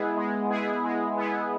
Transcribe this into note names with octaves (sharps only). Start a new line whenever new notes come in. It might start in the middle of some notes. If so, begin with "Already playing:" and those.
Already playing: G#3 B3 E4 G#4
G#3
B3 E4 G#4
G#3
B3 E4 G#4